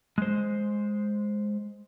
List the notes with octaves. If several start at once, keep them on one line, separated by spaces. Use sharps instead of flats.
G#3 C5